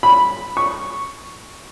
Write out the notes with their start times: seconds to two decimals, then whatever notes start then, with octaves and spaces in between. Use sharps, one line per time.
0.03 B5
0.57 C#6